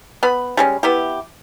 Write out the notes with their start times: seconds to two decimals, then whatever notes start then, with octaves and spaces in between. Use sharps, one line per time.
0.23 B3 B5
0.57 G3 G#3 C#4
0.83 B3 E4 G4